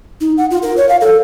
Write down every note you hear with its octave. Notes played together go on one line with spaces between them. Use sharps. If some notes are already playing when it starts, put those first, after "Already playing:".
D#4
F#5
F4
A#4
C#5
F5
A4